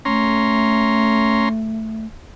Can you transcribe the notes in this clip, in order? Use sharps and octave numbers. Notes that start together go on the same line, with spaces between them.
A3 C#4 A#5 C6